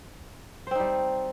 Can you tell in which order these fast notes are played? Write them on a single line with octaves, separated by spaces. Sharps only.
C5 C4 D#4 G3